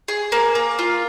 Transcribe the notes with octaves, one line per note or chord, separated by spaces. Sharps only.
G#4
A#3
A#3
F4